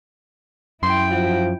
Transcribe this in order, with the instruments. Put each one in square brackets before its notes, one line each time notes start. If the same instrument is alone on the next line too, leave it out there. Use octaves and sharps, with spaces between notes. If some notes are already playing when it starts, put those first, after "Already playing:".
[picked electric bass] F#2 [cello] E4 G5 [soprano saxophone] C6
[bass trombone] F3 [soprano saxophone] F#4